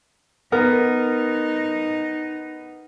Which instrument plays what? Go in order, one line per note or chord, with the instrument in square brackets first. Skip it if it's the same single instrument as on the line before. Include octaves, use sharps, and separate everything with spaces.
[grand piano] B3 [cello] D#4 [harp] A#4